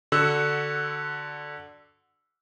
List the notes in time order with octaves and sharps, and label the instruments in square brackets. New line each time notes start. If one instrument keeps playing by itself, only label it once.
[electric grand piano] D3 F#4 F#5 E6